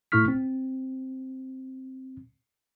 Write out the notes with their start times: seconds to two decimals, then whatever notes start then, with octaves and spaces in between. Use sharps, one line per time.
0.12 A2 A3 E4 C#6 F6 B6
0.28 C4